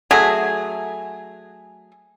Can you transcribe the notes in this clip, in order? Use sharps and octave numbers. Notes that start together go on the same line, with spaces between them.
F#3 A3 G#4